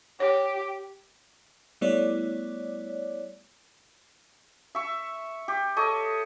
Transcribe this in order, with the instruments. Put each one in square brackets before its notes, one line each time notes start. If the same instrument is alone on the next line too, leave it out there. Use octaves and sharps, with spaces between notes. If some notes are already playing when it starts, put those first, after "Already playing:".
[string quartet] G4 [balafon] C#5
[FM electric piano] G3 A3 B3 E4 C#5 D5
[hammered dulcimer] E5 C#6
G4
A4 C#5 D#5